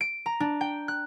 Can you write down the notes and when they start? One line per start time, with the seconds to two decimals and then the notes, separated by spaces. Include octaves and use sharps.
0.01 D7
0.26 A#5
0.40 D4
0.61 G5
0.88 F#6